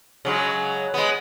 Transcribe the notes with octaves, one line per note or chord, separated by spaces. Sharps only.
C#3 F#3 G#3
G#3 B3